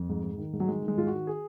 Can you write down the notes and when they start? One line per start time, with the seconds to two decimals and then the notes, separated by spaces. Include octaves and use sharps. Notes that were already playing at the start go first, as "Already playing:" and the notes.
Already playing: F2
0.09 G#2
0.24 G#2
0.38 D#3
0.53 G#2
0.60 F#3
0.68 D#3 G#3
0.82 D#3
0.88 G#3
0.97 G#2 F4
1.07 D#3 F#4
1.27 G#4